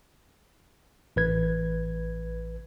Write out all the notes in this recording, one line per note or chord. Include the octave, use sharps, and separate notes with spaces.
A1 B4 G#6